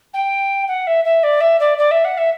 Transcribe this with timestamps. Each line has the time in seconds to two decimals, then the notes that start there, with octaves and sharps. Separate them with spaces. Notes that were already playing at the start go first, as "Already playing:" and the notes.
0.13 G5
0.68 F#5
0.87 E5
1.04 E5
1.23 D5
1.40 E5
1.59 D5
1.78 D5
1.91 E5
2.04 F#5
2.17 E5